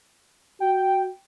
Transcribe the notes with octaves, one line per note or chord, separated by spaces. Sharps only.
F#4 G5